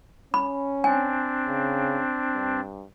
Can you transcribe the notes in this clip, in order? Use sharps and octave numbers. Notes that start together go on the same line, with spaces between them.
C#4 B5
C4 D4 G#5
C#3
G2